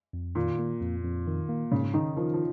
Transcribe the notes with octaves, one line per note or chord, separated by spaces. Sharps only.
F2
A#2 D#3
A#3
F2
F2
D#3
A#3
G#2 C#3
D#3 D#4
D#3 F3
F3